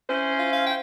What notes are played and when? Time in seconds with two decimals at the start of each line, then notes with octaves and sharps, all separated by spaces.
0.09 C#4 E4 C5
0.38 F4
0.53 F5
0.66 G5